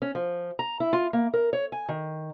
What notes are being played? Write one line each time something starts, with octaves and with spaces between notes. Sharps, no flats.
C#4
F3
A#5
E4
F4
A#3
A#4
C#5
G#5
D#3